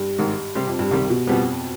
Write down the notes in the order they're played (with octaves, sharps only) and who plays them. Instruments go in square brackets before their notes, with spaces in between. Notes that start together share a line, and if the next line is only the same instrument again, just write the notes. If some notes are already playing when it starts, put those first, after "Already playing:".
Already playing: [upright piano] G2
[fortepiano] G#1 G#2 D#3
C3 G3 C4 G4
[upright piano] F2
G2
[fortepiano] C2 C3 D#3 G3
[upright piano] B2
[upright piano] F2 [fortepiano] B2 G3 B3